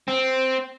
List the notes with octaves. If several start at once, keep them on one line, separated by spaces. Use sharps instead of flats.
C4